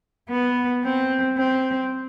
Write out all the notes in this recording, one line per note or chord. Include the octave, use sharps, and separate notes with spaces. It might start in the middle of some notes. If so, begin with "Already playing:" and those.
B3
C4
C4